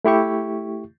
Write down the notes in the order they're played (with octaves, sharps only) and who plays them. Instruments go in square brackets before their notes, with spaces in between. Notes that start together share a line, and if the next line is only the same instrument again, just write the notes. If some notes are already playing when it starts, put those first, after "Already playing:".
[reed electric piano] A3 E4 G4 C#6